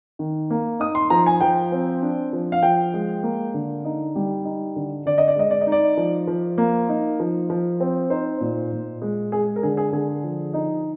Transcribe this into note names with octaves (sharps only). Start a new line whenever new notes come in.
D#3
A#3
D#4 D#6
C6
F3 A#5
G#5
F3 G5
C4
D4
F3
F5
F3 G5
G#3
A#3
D3
D#4
G3
D#4
D3
D3 D5
D#5
D5
G#3 D#5
D5
D#5
D#4
D5
F3
F3
A#3
D#4
F3
F3
C4
D#4 C5
A#2
A#2
G#3
G#3 G#4
A#4
D3 G#4
G#4
D3 G#4
F3
D#4